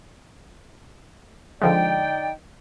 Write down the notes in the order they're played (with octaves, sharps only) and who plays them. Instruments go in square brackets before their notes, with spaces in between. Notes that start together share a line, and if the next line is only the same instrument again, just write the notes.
[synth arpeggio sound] D3 F3 G#3 [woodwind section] D#4 D5 G5